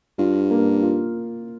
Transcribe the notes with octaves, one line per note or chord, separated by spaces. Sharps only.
G2 F4
A#3
F4